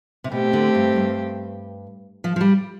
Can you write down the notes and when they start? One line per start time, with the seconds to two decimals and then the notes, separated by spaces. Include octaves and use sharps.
0.24 C3
0.32 B2 A3 C4 G4
0.53 D3
0.75 G2
0.96 G2
2.24 F3
2.36 F3
2.41 G3